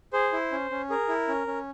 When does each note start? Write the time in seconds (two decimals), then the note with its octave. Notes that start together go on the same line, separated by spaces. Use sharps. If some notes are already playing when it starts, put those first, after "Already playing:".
0.13 G#4 C5
0.33 E4
0.52 C#4
0.71 C#4
0.90 G#4 A#4
1.08 E4
1.28 C#4
1.47 C#4